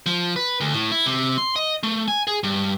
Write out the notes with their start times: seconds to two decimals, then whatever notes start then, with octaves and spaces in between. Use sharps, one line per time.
0.06 F3
0.36 B4
0.60 D2
0.73 A2
0.92 E4
1.06 C3
1.38 C6
1.56 D#5
1.83 A3
2.08 G#5
2.27 G#4
2.43 G2